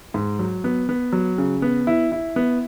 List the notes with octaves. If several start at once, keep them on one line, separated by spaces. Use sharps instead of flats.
G#2
F#3
B3
B3
F#3
C#3
B3
E4
E4
B3